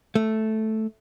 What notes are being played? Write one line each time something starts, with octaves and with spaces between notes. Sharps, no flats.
A3